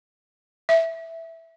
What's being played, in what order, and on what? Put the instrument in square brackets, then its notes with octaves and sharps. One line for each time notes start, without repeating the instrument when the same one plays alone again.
[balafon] E5